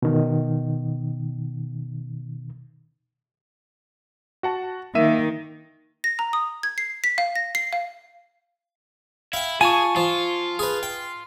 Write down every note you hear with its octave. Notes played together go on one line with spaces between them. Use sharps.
B2 D#3
F#4 F#5 A5
D#3 A#3 E5 D#7
A#6
A#5
D#6
G#6
C7
B6
F5
A#6
C7
F5
E4 F5 G5
F4 G#4 G#5 A5 C#6
F3 F4
G#4 B4
G5